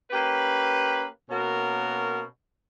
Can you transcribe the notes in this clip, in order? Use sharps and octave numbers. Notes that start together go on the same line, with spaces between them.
A#3 C#4 G4 B4
B2 A#3 C#4 F#4 A#4